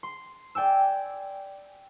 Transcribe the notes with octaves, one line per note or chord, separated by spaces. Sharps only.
C6
D5 G5 G#5 E6